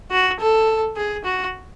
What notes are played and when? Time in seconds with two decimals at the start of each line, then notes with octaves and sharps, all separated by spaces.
0.11 F#4
0.40 A4
0.96 G#4
1.25 F#4